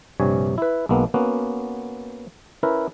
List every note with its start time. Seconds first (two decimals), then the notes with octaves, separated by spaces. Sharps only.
0.20 A#1 G2 C3 G3 C#5 G#5
0.58 E4 B4
0.89 B1 G#3 A#3 B3
1.14 A#3 B3 C#4 F#4
2.63 C#4 E4 A#4 B4